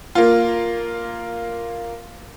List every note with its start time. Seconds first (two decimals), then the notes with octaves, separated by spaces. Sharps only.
0.15 A#3 F4